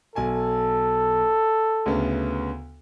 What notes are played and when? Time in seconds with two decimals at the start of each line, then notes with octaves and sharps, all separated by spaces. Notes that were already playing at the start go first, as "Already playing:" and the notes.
0.15 B1 A4 G#5 A5
1.86 D2 C#3 B3